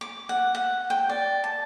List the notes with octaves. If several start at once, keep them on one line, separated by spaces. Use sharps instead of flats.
D6
F#5
F#5
G5
D5
A5